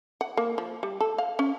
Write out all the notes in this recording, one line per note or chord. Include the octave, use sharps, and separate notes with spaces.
F#5
A#3
F3
G3
A4
F5
C#4